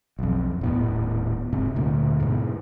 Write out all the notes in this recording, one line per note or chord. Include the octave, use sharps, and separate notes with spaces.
B1 F2
D#1 A2 B3
G#2 C3
D2 A#2
G#2 B2